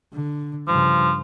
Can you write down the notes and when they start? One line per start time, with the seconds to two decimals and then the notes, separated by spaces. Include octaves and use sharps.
0.13 D3
0.68 G2 C#3 F3